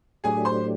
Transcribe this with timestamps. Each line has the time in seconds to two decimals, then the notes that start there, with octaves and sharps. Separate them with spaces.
0.24 A2 F#3 A3 D4 G4 G#4 G#5
0.45 C5 C6